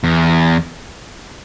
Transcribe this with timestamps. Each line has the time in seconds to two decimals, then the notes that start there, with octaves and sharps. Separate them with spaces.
0.04 E2